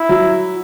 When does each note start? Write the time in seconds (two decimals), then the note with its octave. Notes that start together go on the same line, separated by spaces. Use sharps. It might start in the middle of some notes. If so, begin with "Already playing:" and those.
Already playing: E4
0.09 F#3